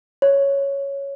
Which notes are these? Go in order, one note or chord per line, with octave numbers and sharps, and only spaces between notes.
C#5